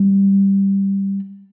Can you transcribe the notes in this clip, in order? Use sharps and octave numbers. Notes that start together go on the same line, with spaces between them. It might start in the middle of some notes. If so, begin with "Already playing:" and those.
Already playing: G3